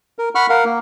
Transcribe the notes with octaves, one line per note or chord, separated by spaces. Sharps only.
A#4
F#5 B5 C#6 F6
A#4 F5 F#5
A#3